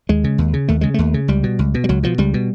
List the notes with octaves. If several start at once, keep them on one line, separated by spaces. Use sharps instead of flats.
D#2 G#3
C#3
D#2
C#3
D#2 A3
C#3 G#3
D#2 A3
C#3
C#2 G3
B2
C#2
B2
G3
C#2 F#3
B2 F3
C#2 G3
B2